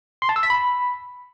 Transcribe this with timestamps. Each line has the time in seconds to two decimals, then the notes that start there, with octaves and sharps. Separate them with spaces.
0.22 C6
0.29 A5
0.36 E6
0.43 B6
0.50 B5